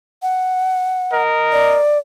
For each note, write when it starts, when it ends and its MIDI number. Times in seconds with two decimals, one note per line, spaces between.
0.23 1.22 78
1.12 1.79 70
1.12 1.79 75
1.52 1.98 74